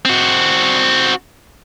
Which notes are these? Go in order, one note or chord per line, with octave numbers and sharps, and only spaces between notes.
C4 F#4